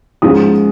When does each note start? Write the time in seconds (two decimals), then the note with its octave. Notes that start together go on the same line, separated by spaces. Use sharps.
0.22 G#2 F3 G#3 C#4 F4 D#6